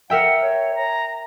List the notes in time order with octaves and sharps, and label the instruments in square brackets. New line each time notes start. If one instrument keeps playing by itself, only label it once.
[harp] A#4 E5 G5 [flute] F#5
[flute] C#5
A#5